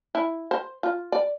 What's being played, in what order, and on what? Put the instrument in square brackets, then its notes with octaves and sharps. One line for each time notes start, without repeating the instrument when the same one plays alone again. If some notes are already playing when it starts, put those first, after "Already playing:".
[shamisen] E4
C5
F4
D5